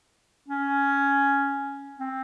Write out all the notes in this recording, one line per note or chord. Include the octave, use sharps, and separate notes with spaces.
C#4
C4